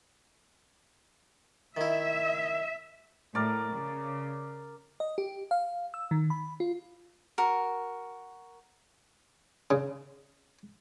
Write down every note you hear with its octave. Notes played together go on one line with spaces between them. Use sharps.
D#3 E4 E5
A2 A#4 D5
C#3
D#5
G4
F5
E6
D#3
B5
F4
F#4 A#4
C#3